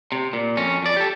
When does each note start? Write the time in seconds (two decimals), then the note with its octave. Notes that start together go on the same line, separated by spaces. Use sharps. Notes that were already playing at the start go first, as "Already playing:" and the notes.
0.12 C3
0.33 A#2
0.57 F2 C#4
0.83 F2 D5
0.96 G4 A4